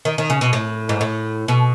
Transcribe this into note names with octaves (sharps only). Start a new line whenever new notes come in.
D#3
D#3
C#3
B2
A2
G#2
A2
B2